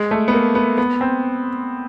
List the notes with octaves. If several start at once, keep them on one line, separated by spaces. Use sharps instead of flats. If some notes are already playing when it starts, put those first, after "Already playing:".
Already playing: G#3
A3
B3
A#3
B3
B3
C4